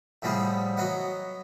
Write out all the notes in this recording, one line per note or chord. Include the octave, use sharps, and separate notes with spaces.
A2 F3 G3 B3 G#4
F#3 B3 D#5 F#5